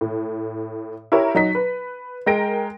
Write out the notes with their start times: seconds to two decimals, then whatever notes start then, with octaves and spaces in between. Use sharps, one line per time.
0.01 A2
1.12 E4 G4 A#4 C#5 E5
1.35 F#3 D#4 B6
1.55 B4
2.26 G#3 A#4 G5 A#6 D7